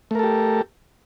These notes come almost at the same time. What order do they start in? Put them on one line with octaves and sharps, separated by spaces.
A3 A#4 A4 G4